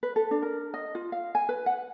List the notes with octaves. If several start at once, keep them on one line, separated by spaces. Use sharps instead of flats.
B4
A4
D4
A#4
D#5
F4
F5
G#5
B4
F#5